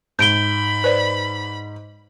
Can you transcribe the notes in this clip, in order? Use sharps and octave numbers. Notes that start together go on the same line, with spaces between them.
G#2 B5 G6 D7 G7
B4 C5 D5